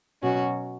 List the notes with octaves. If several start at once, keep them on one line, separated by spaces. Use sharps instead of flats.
B2 F#3 C#4 F#4